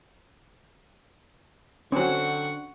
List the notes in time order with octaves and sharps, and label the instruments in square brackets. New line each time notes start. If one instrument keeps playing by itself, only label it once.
[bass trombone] D3 [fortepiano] F#3 C4 [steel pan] C#4 [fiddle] F#5 C#6